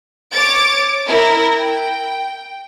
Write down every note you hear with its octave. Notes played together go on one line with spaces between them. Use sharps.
C#5 D6 A6 D7
E4 A#4
G5